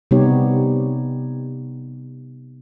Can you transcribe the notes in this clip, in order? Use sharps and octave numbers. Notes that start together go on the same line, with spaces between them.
C3 G3 B3 D#4 G4 C#5